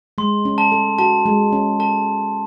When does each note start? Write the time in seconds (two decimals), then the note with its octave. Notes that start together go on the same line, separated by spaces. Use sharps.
0.18 G#3 C6
0.45 C#4
0.58 A5
0.72 A4
0.99 F#4 A5
1.26 G#3
1.53 C#4
1.79 A4 A5